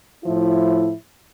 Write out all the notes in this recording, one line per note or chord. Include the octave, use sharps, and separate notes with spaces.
A2 F3 E4